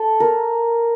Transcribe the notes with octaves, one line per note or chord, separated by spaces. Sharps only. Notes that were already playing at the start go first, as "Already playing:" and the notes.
Already playing: A4
A#4